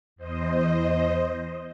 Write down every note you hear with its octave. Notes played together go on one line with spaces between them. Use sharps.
E2 C5 D#5